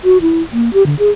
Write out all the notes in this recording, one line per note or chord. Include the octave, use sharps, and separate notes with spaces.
F#4
E4
A#3
G4
D3
G#4